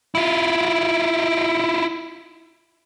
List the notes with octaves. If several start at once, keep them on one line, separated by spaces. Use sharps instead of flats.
E4 F4